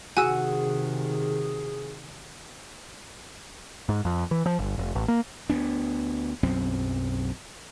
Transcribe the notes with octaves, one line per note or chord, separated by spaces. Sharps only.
C3 D#3 F#4 G#4 G#5 E6
G#2
F2
E3
F3
G1
F1
A1
A#3
D2 B3 D4
B1 F#2 C4